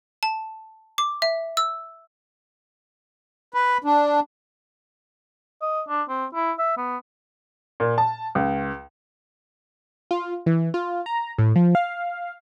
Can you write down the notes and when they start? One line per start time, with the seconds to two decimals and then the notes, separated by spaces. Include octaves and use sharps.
0.23 A5
0.98 D6
1.22 E5
1.57 E6
3.54 B4
3.84 D4
5.62 D#5
5.89 D4
6.09 C4
6.35 E4
6.59 E5
6.77 B3
7.80 A#2
7.98 A5
8.35 C#2
10.11 F4
10.46 E3
10.74 F4
11.06 A#5
11.38 A2
11.56 F3
11.75 F5